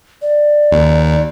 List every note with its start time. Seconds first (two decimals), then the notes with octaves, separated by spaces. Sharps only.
0.22 D5
0.72 D#2